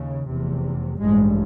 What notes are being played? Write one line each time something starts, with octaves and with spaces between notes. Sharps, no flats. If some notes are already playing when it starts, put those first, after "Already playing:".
Already playing: D#2 C#3
F1 E2 C3
A1 G2 G#3